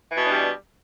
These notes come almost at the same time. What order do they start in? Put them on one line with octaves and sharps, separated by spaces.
E3 B2 B3 D4 G3